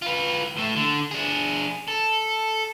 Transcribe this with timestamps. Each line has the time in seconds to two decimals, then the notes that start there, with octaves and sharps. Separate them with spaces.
0.02 F4 B4
0.57 A2 A3
0.76 D3
1.11 D4 G#4
1.88 A4